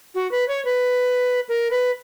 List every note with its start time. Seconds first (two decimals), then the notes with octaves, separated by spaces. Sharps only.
0.15 F#4
0.31 B4
0.48 C#5
0.65 B4
1.49 A#4
1.71 B4